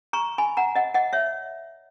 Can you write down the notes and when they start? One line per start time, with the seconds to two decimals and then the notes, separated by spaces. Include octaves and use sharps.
0.13 A#5 C#6
0.38 G#5 B5
0.57 F#5 A#5
0.75 D#5 F#5
0.94 D#5 F#5
1.13 C#5 E5